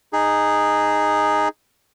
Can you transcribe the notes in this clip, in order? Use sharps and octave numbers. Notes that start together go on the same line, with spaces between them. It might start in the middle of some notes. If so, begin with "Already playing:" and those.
D#4 G#4